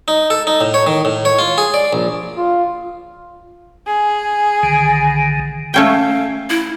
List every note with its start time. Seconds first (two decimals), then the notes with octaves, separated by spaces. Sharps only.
0.08 D#4
0.30 A4
0.47 D#4
0.61 A2
0.74 C#5
0.87 D#3
1.05 A2
1.25 C#5
1.39 F4
1.58 G#4
1.74 D5
1.93 A#1
2.38 F4
3.87 G#4
4.63 B1 D3 D#3
5.74 A3 C#4 F5 G5
6.50 E4